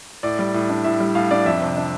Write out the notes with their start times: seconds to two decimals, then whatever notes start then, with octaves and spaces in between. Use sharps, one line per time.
0.23 A2 D5
0.39 G3
0.54 A2
0.69 D4
0.84 A2 E5
1.00 G3
1.15 A2 F5
1.31 D4 D5
1.45 F2 E5
1.61 C3
1.77 D4